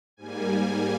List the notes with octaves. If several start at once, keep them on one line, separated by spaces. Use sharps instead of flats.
G#2 G3 A#3 G#5